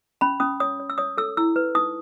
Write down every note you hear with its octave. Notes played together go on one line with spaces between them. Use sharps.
C#4 B5
C#4 D#6
C#5 D#6
C#5
E6
C#5 D#6
A4 E6
E4 E6
B4
D#4 D#6